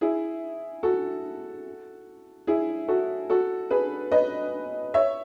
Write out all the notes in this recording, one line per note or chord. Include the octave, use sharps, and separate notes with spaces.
E4 G#4
F#4 A4
E4 G#4
F#4 A4
F#4 A4
G#4 B4
B4 D#5
C#5 E5